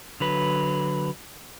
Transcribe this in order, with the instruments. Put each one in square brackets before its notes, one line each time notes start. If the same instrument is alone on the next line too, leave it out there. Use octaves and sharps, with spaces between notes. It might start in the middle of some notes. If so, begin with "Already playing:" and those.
[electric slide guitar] D3 F#3 B4